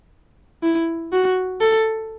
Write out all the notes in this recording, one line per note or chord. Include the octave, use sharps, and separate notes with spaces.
E4
F#4
A4